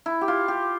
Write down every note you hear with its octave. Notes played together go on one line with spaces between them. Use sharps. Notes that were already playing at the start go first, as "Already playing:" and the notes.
E4
G4
F4
G4